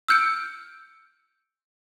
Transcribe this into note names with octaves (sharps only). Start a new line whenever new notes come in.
E6 F6 G6 C#7 D7